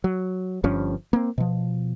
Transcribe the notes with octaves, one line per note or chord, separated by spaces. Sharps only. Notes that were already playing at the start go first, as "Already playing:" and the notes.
F#3
G1 G2 F3 C#4
A#3 C4
B2 F3